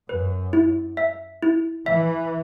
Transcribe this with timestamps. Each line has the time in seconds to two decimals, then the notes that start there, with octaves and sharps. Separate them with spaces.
0.09 F#2 B4
0.53 E4
0.97 E5
1.43 E4
1.86 E3 E5